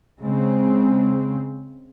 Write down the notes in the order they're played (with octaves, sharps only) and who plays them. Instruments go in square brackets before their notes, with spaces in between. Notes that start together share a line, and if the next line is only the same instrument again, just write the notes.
[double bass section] C#3 G#3 C4